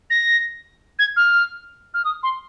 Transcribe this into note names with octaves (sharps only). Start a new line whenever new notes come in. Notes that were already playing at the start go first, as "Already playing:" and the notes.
A#6
G#6
F6
F6
D#6
C6